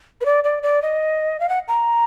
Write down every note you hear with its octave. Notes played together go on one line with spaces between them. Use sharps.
B4
D5
D5
D5
D#5
F5
F#5
A#5